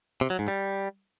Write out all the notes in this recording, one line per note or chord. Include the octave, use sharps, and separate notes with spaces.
C3
F#3
G#2
G3